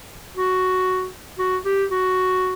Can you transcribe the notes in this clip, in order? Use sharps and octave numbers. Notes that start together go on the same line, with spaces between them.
F#4
F#4
G4
F#4